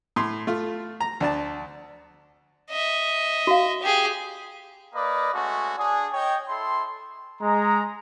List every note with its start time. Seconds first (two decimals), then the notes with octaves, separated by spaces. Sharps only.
0.16 A2 C6
0.47 A3 F4
1.00 A#5
1.20 D2 D4 A5
2.70 D#5 E5
3.47 F#4 F5
3.82 G4 G#4
4.95 A#3 B4 D5 D#5
5.33 G#3 A3 C#4 F#4
5.77 D4 G#4
6.13 C#5 D#5 G5
6.48 E4 A4 C6
7.42 G#3 A#5